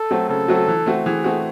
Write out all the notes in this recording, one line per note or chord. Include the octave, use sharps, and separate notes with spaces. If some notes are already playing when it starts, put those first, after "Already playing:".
Already playing: A4
F#3 A3 C4 F#4
C#3 A4
F#3 A3 C4 F#4
E3
A3 C4 F#4
E3 G#4
A3 C4 F#4